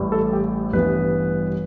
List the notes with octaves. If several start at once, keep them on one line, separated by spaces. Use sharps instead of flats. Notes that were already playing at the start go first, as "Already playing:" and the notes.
Already playing: A1 A2 G3
A4
G4
A1 G2 E3 G3 B3 B4